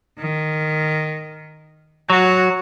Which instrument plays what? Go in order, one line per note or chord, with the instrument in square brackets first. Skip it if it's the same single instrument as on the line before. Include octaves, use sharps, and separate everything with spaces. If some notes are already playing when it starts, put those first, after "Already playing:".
[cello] D#3
[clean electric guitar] F#3 [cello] F#4